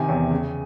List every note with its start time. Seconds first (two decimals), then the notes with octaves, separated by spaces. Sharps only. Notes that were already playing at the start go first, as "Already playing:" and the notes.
Already playing: C3 D#3 G#5
0.09 E2
0.30 C#3